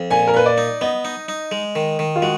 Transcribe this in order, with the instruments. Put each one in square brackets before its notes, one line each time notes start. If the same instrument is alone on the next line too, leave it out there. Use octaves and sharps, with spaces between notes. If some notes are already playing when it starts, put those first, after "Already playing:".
Already playing: [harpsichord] F2
[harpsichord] A#2 [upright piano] G#5
[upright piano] A#4
[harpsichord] A#2 [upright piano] B4
[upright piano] D5
[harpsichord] D#4
[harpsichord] B3 [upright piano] D#5
[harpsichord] D#4
D#4
G#3
D#3
D#3
[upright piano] F4
[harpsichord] G#3 [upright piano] F#4